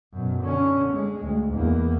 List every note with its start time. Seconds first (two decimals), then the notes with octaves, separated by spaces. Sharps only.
0.13 F#2 B2
0.42 D3 C#4
0.93 G#3
1.23 D2
1.53 E2 A#3